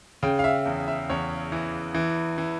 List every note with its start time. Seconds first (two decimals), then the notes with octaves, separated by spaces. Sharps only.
0.23 C#3 G5
0.39 F5
0.44 E5
0.66 E2
0.88 E5
1.10 E2 C#5
1.52 E3
1.94 E3
2.38 E3